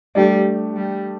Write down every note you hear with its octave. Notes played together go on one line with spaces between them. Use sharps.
G3 A3 D4 G4 D5
G3